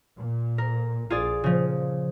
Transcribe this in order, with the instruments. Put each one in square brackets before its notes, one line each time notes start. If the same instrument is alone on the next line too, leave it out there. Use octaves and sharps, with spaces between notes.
[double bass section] A#2
[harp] A#4
[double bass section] A#1 [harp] F4 G#4 D5
[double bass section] A#2 [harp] C#3 F3